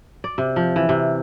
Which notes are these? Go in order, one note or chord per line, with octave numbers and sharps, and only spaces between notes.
D5
C3
F3
E3
C3